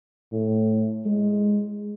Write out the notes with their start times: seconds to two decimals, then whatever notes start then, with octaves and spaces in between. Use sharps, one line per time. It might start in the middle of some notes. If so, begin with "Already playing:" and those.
0.32 A2
1.05 G#3